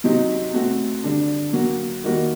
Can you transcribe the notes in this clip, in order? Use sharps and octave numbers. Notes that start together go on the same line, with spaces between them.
C3 F#3 C4 D#4 G4
A3 C4 F#4
D3 G3 D4
F#3 A#3 F#4
D#3 G3 A#3 F#4